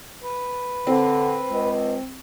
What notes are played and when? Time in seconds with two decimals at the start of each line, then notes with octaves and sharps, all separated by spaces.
0.22 B4
0.87 D3 C4
1.48 C#2